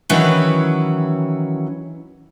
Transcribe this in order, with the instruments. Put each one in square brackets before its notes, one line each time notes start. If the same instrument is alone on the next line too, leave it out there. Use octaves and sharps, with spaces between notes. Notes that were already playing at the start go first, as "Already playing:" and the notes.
[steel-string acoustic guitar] D#3 E3 F#3 C#4 E4 B4